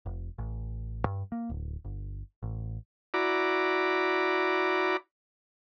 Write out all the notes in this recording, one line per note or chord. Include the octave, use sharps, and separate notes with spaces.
F1
A1
G2
A#3
D1
G1
A1
E4 F#4 D5 A#5 B5 D6